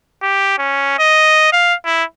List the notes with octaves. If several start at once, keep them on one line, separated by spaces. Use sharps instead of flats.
G4
C#4
D#5
F5
E4